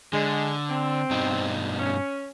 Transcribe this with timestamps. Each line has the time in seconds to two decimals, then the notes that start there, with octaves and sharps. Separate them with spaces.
0.13 D3 G#3
0.69 C4
1.11 G2 B2 D#4
1.79 C#4